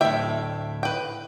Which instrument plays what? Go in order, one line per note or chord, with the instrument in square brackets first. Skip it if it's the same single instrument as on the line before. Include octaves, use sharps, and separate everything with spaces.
[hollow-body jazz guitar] D2 A2 [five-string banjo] E5 G5
[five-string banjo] B4 G5